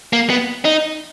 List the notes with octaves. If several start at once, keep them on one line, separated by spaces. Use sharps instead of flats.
A#3
B3
D#4